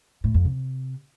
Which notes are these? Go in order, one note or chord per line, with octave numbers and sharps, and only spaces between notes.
A2
F2
C3